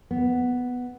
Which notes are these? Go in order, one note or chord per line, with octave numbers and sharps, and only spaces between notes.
B3